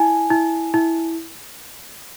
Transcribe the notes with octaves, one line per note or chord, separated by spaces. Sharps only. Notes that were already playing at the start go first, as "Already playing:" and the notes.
Already playing: E4 G#5
E4
E4